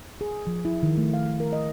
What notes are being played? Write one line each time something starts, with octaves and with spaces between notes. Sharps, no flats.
G#4
F3
E4
D#3
A3
F5
A#4
D#5